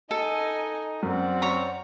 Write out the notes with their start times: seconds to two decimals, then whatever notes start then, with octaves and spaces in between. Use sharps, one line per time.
0.11 D#4 A4 D#5 G#5
1.03 F#2 C4 F#4 D5
1.42 C#5 A#5